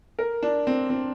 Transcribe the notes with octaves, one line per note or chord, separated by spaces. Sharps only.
A#4
D4
C4
C4